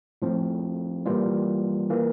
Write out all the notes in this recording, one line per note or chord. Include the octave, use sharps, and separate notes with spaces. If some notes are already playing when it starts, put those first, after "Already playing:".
A2 F3 C4
E3 G3 A#3 F4
E3 A#3